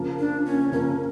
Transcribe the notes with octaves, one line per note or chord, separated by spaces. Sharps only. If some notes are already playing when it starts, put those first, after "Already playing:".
Already playing: C#3 F3 A#3
D4
C#4
C#3 F3 A#3 C#4